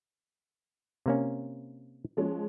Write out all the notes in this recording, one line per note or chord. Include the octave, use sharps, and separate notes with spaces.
C3 A#3 C#4
F3 G#3 C#4